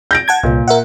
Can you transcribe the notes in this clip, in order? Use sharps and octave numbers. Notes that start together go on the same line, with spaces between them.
G6 A#6 D7
F#5 A5 G#6
C2 A#2
A#4 E5 F#5